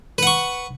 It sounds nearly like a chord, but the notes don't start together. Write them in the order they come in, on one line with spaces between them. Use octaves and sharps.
B4 F#5 C#6